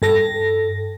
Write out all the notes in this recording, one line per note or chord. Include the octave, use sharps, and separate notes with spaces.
G2 A4 A#6